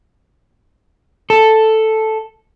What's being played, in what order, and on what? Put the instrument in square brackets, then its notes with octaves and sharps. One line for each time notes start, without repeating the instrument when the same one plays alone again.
[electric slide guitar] A4